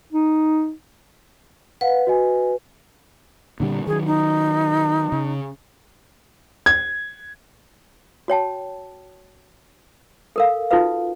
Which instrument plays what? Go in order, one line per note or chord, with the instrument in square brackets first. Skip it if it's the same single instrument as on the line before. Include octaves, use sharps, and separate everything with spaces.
[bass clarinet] D#4
[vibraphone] B4 [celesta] F5 F#5
[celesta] F#4 D#5 G#5
[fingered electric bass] A#2 D3 G3
[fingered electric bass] D#3 F#3 [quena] G#4
[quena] D#4
[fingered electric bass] C#3
[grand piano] G#6
[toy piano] F#4 C#5 G5 A5
A4 A#4 F5
D#4 F4 F#4 A4 B4 F5